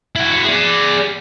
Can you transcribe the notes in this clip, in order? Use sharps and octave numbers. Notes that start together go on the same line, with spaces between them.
E4 F#4
G#4 D5